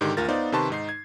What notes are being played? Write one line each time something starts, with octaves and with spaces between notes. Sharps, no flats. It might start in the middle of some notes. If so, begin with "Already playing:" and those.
G#2 D3 D#3 G4
D2 F4 A#4 A6
B3 D#4 C5 D5 F5
C3 D#3 B4 A5 C6 C#6
G#2 D#4 C7
G#6